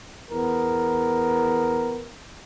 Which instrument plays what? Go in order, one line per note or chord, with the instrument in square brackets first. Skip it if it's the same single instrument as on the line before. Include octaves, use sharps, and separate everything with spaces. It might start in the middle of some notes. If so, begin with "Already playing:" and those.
[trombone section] E2 B3 A#4